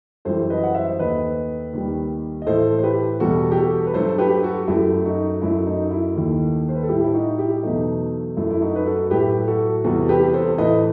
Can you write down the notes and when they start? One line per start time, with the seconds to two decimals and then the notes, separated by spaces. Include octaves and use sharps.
0.25 F#2 E3 G3 A4 C5
0.50 B4 D#5
0.64 F#5
0.74 C5 E5
0.91 C5
0.99 D#2 D#3 A3 B4 D#5
1.73 D#2 D#3 G3
2.42 D#5
2.46 A2 E3 A3 A4 C5
2.78 C5
2.83 G4 B4
3.20 E2 B2 G3 F#4 A4
3.52 G4
3.57 F#4 A4
3.87 B4
3.94 G2 F#3 A3 A4 C5
4.18 G4 B4
4.43 F#4 A4
4.68 F#2 F#3 A3 E4 G4
5.05 D#4 F#4
5.42 F#2 F#3 A3 E4
5.67 D#4
5.91 E4
6.15 D#2 D#3 A3
6.69 C5
6.75 B4
6.83 A4
6.89 A2 G3 E4 G4
7.04 E4
7.14 D#4 F#4
7.38 E4 G4
7.63 E2 B2 F#3 A3 D#4
8.36 F#2 F#3 A3 E4
8.51 E4
8.62 D#4 F#4
8.76 B4
8.86 F#4 A4
9.10 A2 F#3 A3 G4 B4
9.47 F#4 A4
9.84 E2 C3 E3 G3 F#4 A4
10.05 A4
10.09 G4 B4
10.34 A4 C5
10.58 A2 E3 A3 B4 D#5